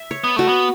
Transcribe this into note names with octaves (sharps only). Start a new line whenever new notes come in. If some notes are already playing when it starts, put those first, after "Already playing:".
Already playing: E5
C#5
B3
A3 F#4
B3